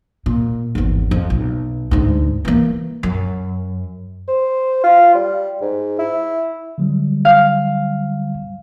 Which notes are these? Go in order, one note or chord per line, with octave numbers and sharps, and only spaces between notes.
A#2
G#1 E2
F2
B1
D2 G#2
E3 A#3
F#2
C5
F4
G3
G#2
E4
D3 F#3 G3
F5